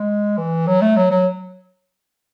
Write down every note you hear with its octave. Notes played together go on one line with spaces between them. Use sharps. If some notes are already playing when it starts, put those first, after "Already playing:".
Already playing: G#3
E3
F#3
A3
F#3
F#3